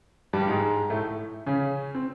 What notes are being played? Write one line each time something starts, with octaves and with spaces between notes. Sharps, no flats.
G2 G3
G#2 G#3
A2 A3
C#3 C#4
C4